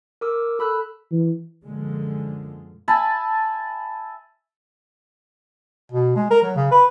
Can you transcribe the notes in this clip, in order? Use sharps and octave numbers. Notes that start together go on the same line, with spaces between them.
A#4 D6 E6
A4 B5 E6 F#6
E3
F#2 A#2 D3 F3 G#3
E5 G#5 A5 B5
B2
G#3
A#4
F#3
C#3
B4